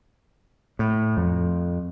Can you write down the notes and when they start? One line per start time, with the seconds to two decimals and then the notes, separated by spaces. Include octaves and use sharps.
0.79 A2
1.17 F2